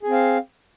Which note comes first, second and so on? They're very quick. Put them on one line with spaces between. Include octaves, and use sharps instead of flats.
G#4 C4 F5